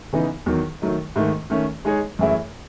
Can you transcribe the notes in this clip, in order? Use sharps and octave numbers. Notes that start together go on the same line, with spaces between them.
C#3 E3 B3 D#4
E2 D#3 F#3
D#3 F#3 A3 D#4
G#2 D#3 A3
D#3 A3 C#4
G#3 D#4 G#4 C#5
F#2 E3 A3 E4 G#4